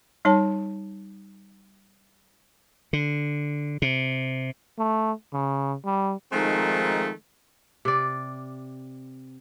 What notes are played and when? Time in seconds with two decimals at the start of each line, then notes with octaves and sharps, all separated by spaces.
0.25 G3 D#4 C#5 A5
2.93 D3
3.82 C3
4.79 A3
5.33 C#3
5.85 G3
6.32 D#3 F3 G#3 A3 C4 D#4
7.85 C3 D5